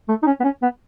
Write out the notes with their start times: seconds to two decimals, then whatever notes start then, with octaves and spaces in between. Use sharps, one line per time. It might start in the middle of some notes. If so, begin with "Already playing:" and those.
0.08 A3
0.23 D#4
0.27 C#4
0.40 B3
0.44 C#4
0.62 B3